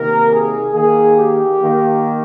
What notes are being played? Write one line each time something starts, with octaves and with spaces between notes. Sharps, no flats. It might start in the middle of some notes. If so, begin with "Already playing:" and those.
Already playing: C3 D#3 A#3 A#4
G#4
D#3 A#3 G#4
G4
D#3 A#3